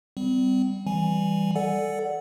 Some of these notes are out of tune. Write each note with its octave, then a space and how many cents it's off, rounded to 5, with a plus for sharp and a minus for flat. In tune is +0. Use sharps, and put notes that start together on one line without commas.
G3 +0 C4 -35
E3 +0 G3 +5 G#5 +0
A4 +0 D5 +0 F#5 +0